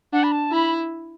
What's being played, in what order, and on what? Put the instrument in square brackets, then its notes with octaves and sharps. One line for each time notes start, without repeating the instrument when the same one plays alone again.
[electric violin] D4 [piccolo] F#5
[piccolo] B5
A5
[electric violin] E4 [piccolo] B5